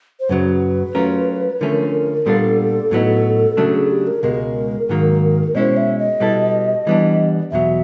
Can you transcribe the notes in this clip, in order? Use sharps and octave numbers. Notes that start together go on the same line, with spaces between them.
C5
F#2 C#3 F#3 B4
F#3 A3 C#4 F4 A#4
D3 F3 A3 C#4 A#4
A#2 G3 B3 D4 F4 A4
A2 F#3 B3 D#4
C#3 F#3 A3 D4
G#4
G4
A#4
C#2 B2 G#3 A#4
G#2 D#3 F#3 A#3
B2 G#3 C#4 E4 C5 D#5
E5
D#5
B2 G3 B3 E4 A4
E3 G3 B3 D4
E2 B2 F#3 E5